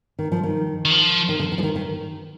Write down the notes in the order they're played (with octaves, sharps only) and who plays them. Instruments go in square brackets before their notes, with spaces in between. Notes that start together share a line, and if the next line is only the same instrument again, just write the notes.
[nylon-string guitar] D#3
F3
D#3
[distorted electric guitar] D#3
F3
[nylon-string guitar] D#3
D3
D#3
F3
D#3
D#3